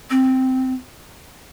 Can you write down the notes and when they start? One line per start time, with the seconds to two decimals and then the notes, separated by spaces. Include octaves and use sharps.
0.10 C4